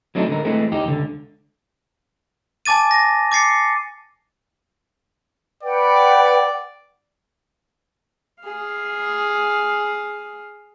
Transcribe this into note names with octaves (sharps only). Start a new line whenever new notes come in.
F#3 A3 C4 D4 D#4
D3 G#3 A#4
E3 G#3 A3 C4
E2 D#4 G4
C#2 D3
G#5 A5 D6 A6 D#7
A#6
D6 A6 C7 C#7
B4 D5 F#5 G5
G#4 F5